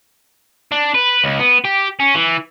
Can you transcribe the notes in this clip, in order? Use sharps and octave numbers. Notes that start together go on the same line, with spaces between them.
D4
B4
C#2
B3
G4
C#4
E3